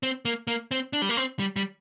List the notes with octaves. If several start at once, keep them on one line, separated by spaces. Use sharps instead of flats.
C4
A#3
A#3
C4
D4
G3
A#3
C4
G3
G3